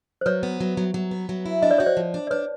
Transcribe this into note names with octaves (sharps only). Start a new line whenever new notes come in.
C5
F#3 B4 C#5
B3
F#3
F#3
F#3
B3
F#3
E4
D4 D#5
D5
F#4 C#5
C5 D5
F3
D4
D5
D4 B4 C#5